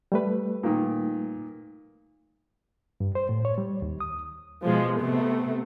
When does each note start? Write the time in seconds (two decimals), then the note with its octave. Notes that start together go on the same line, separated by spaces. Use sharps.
0.12 G3 A3 B4
0.63 A#2 D#3
3.00 G2
3.15 C5
3.29 A2
3.45 C#5
3.58 G3
3.82 D#2
4.00 D#6
4.62 B2 F3 G#3
4.99 C3 A3 B3